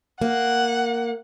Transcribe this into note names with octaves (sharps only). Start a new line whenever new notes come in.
A#3 F#5